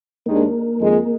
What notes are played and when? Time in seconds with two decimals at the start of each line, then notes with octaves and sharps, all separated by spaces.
0.26 D#2 D#3 G#3 A#3 D4
0.79 F2 D#3 G#3